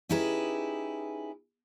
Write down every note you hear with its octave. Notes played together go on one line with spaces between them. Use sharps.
C#4 D#4 E4 G4 G#4 B4